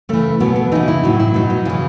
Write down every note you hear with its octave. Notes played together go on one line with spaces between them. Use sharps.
C#3 E3 A3
B2 F#3 B3
B3
C#3 E3 D#4
E4
A2 F#3
E4
B2 F#3 D#4
D#4
C#3 E3